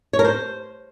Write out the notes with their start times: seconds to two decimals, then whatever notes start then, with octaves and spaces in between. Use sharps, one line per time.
0.13 C#5
0.19 A#4
0.25 C5